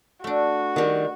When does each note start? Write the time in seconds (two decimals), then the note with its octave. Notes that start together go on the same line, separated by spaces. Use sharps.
0.24 A3 D4 F#4
0.76 D#3 G3